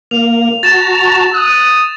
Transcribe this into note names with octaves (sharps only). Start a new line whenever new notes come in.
A#3 F7
F#4 A5 A#5 A6 E7
D#6 F#6